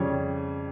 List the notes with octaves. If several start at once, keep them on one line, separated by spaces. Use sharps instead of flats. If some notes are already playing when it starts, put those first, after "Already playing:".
Already playing: F2 C#3 G3 C#5